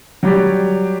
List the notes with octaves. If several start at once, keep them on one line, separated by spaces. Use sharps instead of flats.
F#3 G3 G4 D5